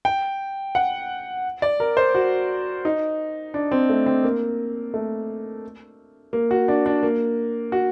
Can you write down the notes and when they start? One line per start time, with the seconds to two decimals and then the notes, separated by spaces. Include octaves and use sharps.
0.05 G5
0.75 F#5
1.62 D5
1.80 A#4
1.97 C5
2.15 F#4
2.85 D#4
3.54 D4
3.71 C4
3.89 A3
4.06 C4
4.24 A#3
4.94 A3
6.33 A#3
6.51 F#4
6.68 D4
6.86 D4
7.03 A#3
7.72 F#4